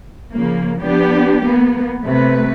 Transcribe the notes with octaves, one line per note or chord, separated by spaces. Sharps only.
C#3 F3 A#3
F3 B3 D4 G4
A#3 B3
C3 A3 B4